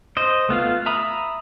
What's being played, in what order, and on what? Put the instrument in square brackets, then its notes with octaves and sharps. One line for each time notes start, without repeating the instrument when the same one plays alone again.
[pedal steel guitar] C5 D#5
A3 B3 F4 F5
E5 A#5 B5 D#6